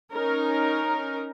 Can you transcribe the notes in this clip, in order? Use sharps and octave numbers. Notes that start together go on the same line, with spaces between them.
C#4 D#4 A#4